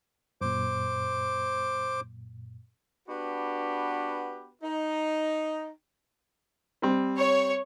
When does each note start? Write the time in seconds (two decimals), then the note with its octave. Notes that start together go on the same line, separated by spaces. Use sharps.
0.41 F#2 A#2 C5 D6
3.08 B3 D4 F#4 G4 B4
4.62 D#4
6.82 G3 C4
7.17 C#5